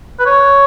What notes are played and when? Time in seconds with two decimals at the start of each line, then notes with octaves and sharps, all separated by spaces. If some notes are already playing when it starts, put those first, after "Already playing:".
0.19 B4
0.26 C#5